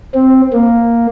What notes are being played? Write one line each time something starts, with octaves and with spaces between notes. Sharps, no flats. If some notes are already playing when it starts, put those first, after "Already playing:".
C4
A#3